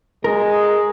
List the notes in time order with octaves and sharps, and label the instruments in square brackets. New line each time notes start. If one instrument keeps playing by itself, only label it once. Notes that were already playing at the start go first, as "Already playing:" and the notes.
[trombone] G#3 [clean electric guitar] A#4